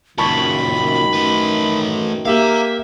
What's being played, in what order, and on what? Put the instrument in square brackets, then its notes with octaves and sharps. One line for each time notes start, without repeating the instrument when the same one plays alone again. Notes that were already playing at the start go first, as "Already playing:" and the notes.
[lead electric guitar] C#2 A#2 [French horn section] F#2 D#3 [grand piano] A5 C#6 [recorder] B5
[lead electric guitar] A3 B4
[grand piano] A#3 G4 A#4 [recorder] E5 [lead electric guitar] F5 A#5